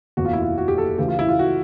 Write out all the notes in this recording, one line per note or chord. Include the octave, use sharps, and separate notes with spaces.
F#1 E2 B2 F#4
F4
E4
F4
F#4
G4
A4
D2 C#3 E3 G4
F4
E4
F4
F#4